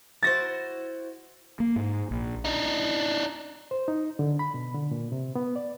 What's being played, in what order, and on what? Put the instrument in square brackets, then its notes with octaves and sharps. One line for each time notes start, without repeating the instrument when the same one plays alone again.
[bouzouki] E4 F#4 C5 [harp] A6 A#6
[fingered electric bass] A#3
G#2
A#1
[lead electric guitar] D4 D#4
[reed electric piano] C5
D#4
D3
B5
B2
D3
A#2
C3
B3
D5